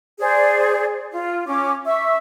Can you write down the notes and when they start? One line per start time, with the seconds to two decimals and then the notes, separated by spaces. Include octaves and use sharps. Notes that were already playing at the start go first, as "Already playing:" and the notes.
0.20 G#4 C5 D5
1.12 F4
1.47 C#4 D6
1.86 E5 C#6 E6